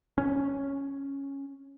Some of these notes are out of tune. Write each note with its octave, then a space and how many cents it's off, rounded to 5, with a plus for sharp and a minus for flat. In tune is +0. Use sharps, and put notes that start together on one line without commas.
C#4 -5